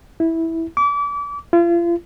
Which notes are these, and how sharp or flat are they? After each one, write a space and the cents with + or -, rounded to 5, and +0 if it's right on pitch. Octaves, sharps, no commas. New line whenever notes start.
E4 -10
D6 -35
F4 -40